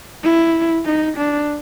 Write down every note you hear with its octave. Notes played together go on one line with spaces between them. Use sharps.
E4
D#4
D4